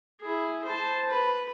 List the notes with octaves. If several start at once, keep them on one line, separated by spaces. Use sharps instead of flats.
E4 G#4
C5 A5
B4